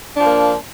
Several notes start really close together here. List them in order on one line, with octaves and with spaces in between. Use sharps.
D4 F3 A#3